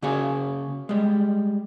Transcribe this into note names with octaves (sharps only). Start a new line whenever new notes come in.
C#3 A#3 C#4 F#4 G#4 C#5
G3 G#3